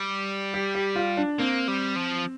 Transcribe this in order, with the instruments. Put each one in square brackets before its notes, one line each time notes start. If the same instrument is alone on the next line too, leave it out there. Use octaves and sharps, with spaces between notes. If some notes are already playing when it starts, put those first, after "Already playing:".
Already playing: [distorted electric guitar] G3
[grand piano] G4
G4
F4
D4
[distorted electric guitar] A#3 [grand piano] C4
[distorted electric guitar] G3
F3